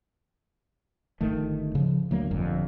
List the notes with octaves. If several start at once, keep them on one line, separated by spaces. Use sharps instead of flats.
G1 D#3 A3
C#3 F3
D2 F#3 A#3
G1 F2 A#2